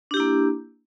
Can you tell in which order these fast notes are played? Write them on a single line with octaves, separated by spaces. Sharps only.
D4 G4 E4 A#3